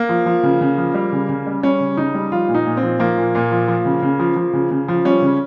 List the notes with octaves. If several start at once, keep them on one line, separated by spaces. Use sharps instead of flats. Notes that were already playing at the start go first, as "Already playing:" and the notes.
Already playing: A#3
F3
F3
C#3
C#3
F3
G3
C#3
C#3
G3
G3 C#4
C#3
C#3 D#4
G3
F3 F4
A#2
D#4
A#2
C4
F3
F3 A#3
A#2
A#2
F3
F3
C#3
C#3
F3
F3
C#3
C#3
F3
G3 C#4
C#3